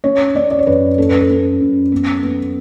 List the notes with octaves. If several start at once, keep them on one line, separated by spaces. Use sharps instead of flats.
C#4 C#5
C#4 D5
D5
C#5
F#2 B4
C#4 A4
B4
A4
C#4
F#2
B3
B3